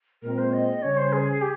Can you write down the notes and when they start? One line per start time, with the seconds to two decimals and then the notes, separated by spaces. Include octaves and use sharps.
0.23 A#2 G#3 C4 A#4
0.38 C5
0.53 D#5
0.82 C#3 G3 C#4 C#5
0.97 C5
1.12 G#4
1.41 G4